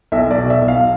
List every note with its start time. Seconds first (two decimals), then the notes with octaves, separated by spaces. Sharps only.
0.12 B1 E5
0.31 D5
0.38 B2
0.50 E5
0.62 B1
0.68 F5